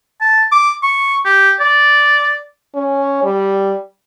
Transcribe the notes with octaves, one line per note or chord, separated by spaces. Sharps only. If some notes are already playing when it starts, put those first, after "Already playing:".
A5
D6
C#6
G4
D5
C#4
G3